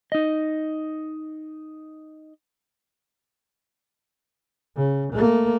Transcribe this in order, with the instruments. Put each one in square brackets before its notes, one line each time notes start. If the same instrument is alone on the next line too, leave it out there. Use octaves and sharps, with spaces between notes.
[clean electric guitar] D#4 D#5
[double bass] C#3
A3 A#3